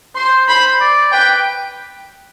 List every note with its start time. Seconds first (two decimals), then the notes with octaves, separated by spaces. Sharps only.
0.16 C5 C6
0.48 C5 B5
0.81 D5
1.13 B4 G5